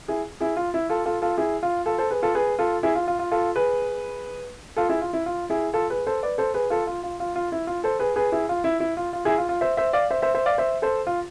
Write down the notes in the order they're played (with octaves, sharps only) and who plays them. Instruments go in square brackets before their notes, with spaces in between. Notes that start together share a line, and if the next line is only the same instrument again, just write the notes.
[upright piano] E4 G#4
E4 G#4
F4
E4
F4 A4
F4 A4
F4 A4
E4 G#4
F4
F4 A4
A4 C5
G#4 B4
F4 A4
G#4 B4
F4 A4
E4 G#4
F4
F4
F4
F4 A4
G#4 B4
F4 A4
E4 G#4
F4
E4
F4
E4 G#4
F4 A4
G#4 B4
A4 C5
B4 D5
A4 C5
G#4 B4
F4 A4
F4
F4
F4
F4
E4
F4
A4 C5
G#4 B4
G#4 B4
E4 G#4
F4
E4
E4
F4
F4
E4 G#4
F4
F4
C5 E5
C5 E5
D5 F5
C5 E5
C5 E5
C5 E5
D5 F5
C5 E5
A4 C5
F4